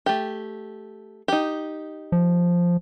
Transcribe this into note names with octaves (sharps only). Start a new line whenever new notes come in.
A3 G4
D#4 G4
F3